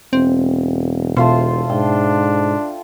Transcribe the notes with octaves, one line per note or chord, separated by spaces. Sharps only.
E1 C4
B2 A3 F4 C5
G#2 D4 G5